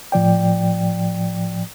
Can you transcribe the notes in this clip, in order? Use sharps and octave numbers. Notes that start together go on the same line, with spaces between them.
A2 F3 D5 G5